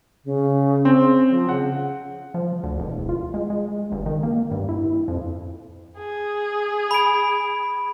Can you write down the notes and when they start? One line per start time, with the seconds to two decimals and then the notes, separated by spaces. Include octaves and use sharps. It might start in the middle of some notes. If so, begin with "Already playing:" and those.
0.24 C#3
0.85 C4
1.30 F3
1.49 C#3 F#5
2.34 F3
2.64 D2
2.79 E1
3.09 F4
3.34 G#3
3.50 G#3
3.92 G1
4.06 D#3
4.23 A#3
4.51 G2
4.69 E4
5.08 F2
5.98 G#4
6.91 B5 D7